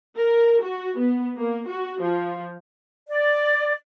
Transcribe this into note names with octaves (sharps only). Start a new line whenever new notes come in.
A#4
F#4
B3
A#3
F#4
F3
D5